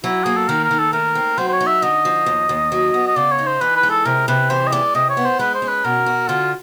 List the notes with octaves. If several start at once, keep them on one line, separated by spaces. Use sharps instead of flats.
F#3 E4
A#3 G#4
A4
D#3 A#4
A#4
D#3
A4
A3 A#4
C4
F#3 C5
C5
C#5
D#4
E5
D3 D#5
F3
D#2
D#2
F#3
B3
D#5
C#3 D5
C#5
D#4
C5
E3 B4
B4
G#3
A4
C3 A#4
C3 B4
E3 C5
D#5
G#3 D5
C3 D#5
C#5
B3
C5
G#3 B4
C5
C#4
B4
B2 A#4
F#4
D3 F4